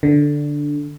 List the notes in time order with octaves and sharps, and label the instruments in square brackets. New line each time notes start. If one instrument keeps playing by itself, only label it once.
[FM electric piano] D3